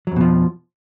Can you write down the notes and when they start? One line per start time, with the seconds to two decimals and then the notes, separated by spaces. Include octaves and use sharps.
0.07 F#3
0.12 F2
0.16 B2
0.21 F3